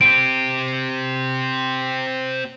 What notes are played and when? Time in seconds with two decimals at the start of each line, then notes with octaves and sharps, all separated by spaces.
0.01 C4 G4 D7